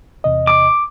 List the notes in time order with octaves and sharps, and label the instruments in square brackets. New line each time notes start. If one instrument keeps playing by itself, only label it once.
[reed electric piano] E2 C3 D#5
[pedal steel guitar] D6